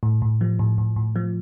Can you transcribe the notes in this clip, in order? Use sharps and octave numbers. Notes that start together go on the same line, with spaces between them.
A2
A2
F3
A2
A2
A2
F3